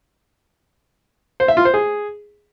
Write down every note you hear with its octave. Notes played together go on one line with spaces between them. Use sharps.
C5
E5
F4
C5
G#4